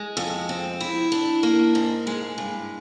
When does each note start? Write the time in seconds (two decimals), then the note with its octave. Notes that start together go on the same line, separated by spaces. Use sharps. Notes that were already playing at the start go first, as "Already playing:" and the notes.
Already playing: G#3
0.17 F2
0.49 C4
0.80 E4
1.12 D4
1.43 A#3
1.75 G#2
2.07 G#3
2.38 G2